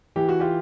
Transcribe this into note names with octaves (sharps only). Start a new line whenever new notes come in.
E3 G4
F#4
F4 G4